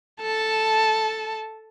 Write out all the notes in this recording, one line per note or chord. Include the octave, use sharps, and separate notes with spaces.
A4 A5